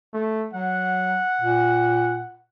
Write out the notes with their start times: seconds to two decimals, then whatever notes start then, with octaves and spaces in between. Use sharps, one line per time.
0.14 A3
0.54 F#3 F#5
1.41 A#2